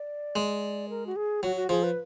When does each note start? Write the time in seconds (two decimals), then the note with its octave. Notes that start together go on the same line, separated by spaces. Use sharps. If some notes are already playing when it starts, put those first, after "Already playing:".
Already playing: D5
0.36 G#3
0.90 A#4
1.07 F#4
1.16 G#4
1.43 F#3 F#4
1.56 F#4
1.69 F3 G#4
1.83 B4